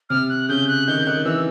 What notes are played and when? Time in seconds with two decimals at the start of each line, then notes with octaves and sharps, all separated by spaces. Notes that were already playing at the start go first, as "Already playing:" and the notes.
0.10 C3 F6
0.29 F#6
0.49 C#3 G6
0.68 F#6
0.87 D#3 G6
1.07 D#3 F#6
1.25 E3 E6